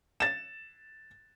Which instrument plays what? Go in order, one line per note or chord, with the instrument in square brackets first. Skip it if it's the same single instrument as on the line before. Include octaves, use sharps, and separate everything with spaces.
[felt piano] A6 E7